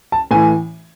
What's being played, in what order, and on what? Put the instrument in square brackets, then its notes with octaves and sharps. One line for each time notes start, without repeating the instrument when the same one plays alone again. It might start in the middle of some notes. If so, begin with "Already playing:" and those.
[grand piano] A5
A2 E3 G#5